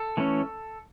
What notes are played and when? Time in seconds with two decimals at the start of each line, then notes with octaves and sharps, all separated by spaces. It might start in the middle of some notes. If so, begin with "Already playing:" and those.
Already playing: A4
0.17 E3 A3 C#4